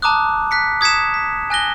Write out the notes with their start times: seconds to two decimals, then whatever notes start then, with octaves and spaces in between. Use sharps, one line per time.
0.02 A5 A#5 D6 D#6 F#6
0.51 F#6 B6 C#7
0.81 D#6 G#6 B6 C#7 E7
1.14 B6
1.50 G#5 F#6 A#6 G7